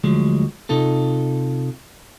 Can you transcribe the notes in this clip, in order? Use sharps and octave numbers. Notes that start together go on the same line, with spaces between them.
D2 F3 F#3 G#3
C3 D#4 F4 A4